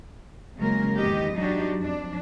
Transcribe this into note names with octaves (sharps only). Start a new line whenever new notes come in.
C#3 F#3 G#3 A#3 A#4
E2 G#2 D#3 B3 G4 D#5
F#3 D4 D#4 F#4 G4
F2 D4